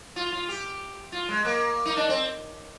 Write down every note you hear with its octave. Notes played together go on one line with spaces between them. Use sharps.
F4
F4
G4
F4
G#3
A#3
D#4
D4
C4